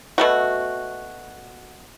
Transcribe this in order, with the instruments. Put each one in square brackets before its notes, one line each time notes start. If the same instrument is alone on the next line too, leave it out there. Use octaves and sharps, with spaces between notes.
[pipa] B2 A3 F#4